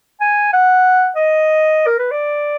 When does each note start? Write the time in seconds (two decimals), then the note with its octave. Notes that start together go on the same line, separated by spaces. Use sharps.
0.21 G#5
0.53 F#5
1.16 D#5
1.86 A#4
1.98 B4
2.11 D5